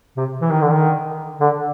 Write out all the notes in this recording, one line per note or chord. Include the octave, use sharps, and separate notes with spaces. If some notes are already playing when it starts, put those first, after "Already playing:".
C3
E3
D#3
D3
D#3
D3